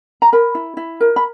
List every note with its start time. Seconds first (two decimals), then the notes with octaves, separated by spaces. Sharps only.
0.22 A#5
0.33 A#4 B5
0.55 E4
0.77 E4
1.00 A#4
1.16 B5